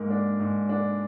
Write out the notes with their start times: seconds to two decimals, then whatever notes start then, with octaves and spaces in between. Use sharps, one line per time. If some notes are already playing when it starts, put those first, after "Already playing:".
Already playing: G#2 A#3
0.10 D4
0.40 G#2
0.69 D4